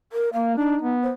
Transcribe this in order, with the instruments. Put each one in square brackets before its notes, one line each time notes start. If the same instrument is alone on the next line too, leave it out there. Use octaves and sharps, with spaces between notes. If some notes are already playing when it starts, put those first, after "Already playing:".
[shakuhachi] A#4
[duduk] A#3 [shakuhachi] F5
[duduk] D4 [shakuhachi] D#4
[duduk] B3
[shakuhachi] C5